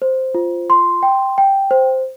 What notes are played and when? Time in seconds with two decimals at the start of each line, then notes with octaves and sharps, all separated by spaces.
0.02 C5
0.34 F4
0.70 C6
1.03 G5
1.38 G5
1.71 C5